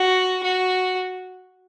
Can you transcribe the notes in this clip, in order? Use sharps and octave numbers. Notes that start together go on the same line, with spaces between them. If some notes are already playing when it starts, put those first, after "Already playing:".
Already playing: F#4
F#4